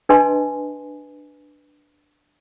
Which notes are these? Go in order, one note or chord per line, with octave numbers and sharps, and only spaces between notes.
D4 B4 D#5 G#5 A5 C6